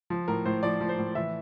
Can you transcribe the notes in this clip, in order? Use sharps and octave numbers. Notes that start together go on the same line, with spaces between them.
F3
A2 A#4
A2 C5
F3 D5
F3
C5
A2
E3 E5